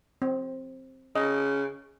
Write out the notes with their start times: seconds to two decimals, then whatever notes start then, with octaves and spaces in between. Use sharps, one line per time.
0.22 C4
1.15 C#3 D#5